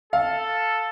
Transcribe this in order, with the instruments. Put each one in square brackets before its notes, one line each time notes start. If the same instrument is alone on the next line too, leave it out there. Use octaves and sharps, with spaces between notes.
[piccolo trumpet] A4 [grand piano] F5